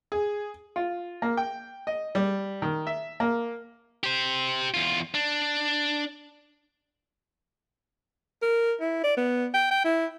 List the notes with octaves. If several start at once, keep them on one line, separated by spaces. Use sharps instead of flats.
G#4
F4
A#3
G5
D#5
G3
D#3
E5
A#3
G4 C5
E2 F4
D4
A#4
E4
D5
B3
G5
G5
E4